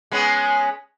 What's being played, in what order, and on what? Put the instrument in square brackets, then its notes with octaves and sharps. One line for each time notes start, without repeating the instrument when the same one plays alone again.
[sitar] G#3 B3 C#4